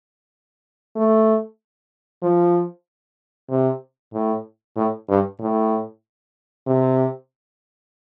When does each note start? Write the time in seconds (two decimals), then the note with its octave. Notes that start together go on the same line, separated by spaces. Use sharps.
0.96 A3
2.22 F3
3.49 C3
4.13 A2
4.76 A2
5.09 G2
5.40 A2
6.67 C3